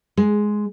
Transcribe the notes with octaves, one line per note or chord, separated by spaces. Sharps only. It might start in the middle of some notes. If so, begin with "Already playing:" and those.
G#3